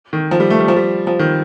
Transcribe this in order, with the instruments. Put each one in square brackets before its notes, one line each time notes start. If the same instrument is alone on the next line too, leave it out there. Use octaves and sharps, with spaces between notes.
[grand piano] D#3
F3
G3
A3
G3
F3
G3
F3
D#3